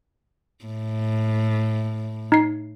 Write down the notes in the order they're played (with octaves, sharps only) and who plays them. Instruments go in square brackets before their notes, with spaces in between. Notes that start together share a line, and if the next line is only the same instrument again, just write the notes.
[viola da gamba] A2
[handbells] D#4 C7